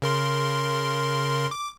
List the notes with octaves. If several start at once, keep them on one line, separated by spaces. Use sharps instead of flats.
C#3 A#4 C6
D6